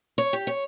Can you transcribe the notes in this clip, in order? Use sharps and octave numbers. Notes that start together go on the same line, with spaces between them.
C#5
G4
C#5